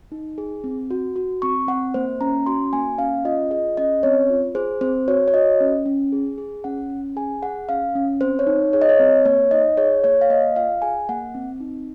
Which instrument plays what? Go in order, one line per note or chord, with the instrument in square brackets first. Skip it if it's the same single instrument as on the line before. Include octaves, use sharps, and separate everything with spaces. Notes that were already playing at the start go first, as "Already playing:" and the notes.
[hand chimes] D#4
G#4
C4
F#4
F#4
C4 C#6
C4 F#5
A#3 C5
C#4 A#5
F#4 C6
A#3 G#5
C#4 F5
F4 D#5
G#4 D#5
C#4 D#5
C4 C#5
F4
G#4 C5
C4 C5
F#4 C#5
C#5
F#4 D#5
C#4
C#4
G#4
G#4
C#4 F#5
C#4
G#4 G#5
G#4 F#5
C#4 F5
C#4
C4 C5
C#5
D#4
G#4 C#5
D#5
C#5
C4
A#3 C#5
D#4 D#5
G#4 C#5
A#3 C#5
F5
A#3 D#5
F4 F5
G#4 G#5
A#3 F#5
C4
D#4